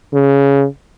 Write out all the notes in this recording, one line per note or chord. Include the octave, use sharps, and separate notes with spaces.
C#3